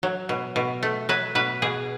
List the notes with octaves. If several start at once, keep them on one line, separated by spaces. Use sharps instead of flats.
F#3
B2
B2
A3
F#3 B4
B2 B4
B2 G#4